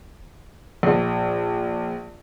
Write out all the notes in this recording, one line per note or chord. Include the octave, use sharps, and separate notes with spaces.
A#1